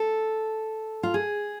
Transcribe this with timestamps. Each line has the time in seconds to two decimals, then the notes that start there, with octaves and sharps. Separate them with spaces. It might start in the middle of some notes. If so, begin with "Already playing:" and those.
Already playing: A4
1.03 F4
1.14 G#4